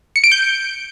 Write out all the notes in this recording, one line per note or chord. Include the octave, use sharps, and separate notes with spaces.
C#7
D7
G6